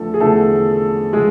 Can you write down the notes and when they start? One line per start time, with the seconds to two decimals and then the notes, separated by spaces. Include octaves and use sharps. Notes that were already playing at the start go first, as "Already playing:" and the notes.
Already playing: E2 D3 F3 A3 A4
0.14 G#4
0.20 E2 D3 F3 A3 A4
1.13 D3 F3 G#3 G#4